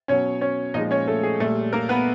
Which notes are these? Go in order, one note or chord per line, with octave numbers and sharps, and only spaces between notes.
B2 F#3 C#4 C#5
C#4 C#5
A#2 F3 G#3 D#4 D#5
C#4 C#5
A3 A4
G#4
A#2 G3 A3 A4
A#3 A#4
B3 B4